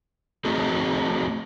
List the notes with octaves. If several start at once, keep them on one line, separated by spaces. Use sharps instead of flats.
A3 C4 D#4 F#4 G#4